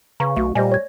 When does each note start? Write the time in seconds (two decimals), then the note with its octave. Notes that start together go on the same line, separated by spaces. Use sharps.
0.20 C#3 B4 F5 A#5 C#6
0.37 B1 A3 F#4
0.55 A#2 G3 C5 D5 D#5 G#5 A#6
0.72 C#5 G#6